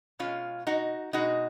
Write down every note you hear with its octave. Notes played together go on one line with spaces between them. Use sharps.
B2 G#3 C#4 F4
D#4 F#4
B2 G#3 D#4 F#4